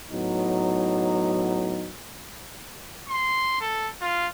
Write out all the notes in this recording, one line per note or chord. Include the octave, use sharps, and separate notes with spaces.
A2 F#3 B3 D#4
C6
A4
F4